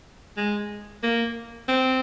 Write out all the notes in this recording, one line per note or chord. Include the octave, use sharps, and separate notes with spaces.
G#3
A#3
C4